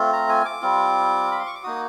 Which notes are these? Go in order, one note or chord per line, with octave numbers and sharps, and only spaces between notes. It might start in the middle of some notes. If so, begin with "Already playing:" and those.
Already playing: A3 C4 F4
A#5
G#5
D6
G3 C4 F4
B5
C6
C#6
D6
A#3 D#4 F#4 D#6